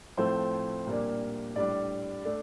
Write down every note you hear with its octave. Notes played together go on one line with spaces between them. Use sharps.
A2 F3 A3 C4 C5
A#2 G3 A#3 D4
A2 G3 D4 D5
A3 D4